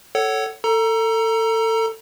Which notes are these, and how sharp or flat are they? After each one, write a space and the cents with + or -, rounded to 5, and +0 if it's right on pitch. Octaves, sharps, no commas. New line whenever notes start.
A4 +0 C#5 +0 F#5 +25
A4 +25 A#5 +15